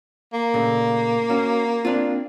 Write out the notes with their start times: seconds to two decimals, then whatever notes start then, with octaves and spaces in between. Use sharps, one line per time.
0.34 A#3
0.54 A#2 C#3 A3
1.30 C#4 F#4
1.85 C4 D4 F4